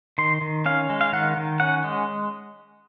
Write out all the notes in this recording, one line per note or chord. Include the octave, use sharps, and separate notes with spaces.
D#3 C6
D#3
C#4 F5
G#3
F5
D#3 F#5
D#3
C#4 F#5
G#3